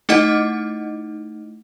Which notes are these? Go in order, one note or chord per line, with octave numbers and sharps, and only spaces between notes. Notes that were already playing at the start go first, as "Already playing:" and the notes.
A3 D#4 E4 D#5 F#5